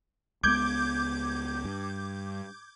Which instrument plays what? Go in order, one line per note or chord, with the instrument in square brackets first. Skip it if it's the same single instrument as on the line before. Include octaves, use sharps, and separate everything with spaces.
[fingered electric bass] C#2 G#3 B3 [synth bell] D6 G6 G#6
[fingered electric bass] G2